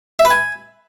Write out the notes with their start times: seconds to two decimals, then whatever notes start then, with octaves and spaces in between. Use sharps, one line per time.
0.19 E5
0.25 B4
0.31 G#5